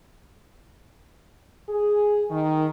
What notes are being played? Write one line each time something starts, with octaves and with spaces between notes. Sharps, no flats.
G#4
D#3